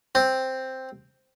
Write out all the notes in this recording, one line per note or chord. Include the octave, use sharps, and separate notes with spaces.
C4